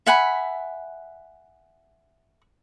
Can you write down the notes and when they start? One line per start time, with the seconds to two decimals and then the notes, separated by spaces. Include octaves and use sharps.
0.06 E5 F#5 G#5 B5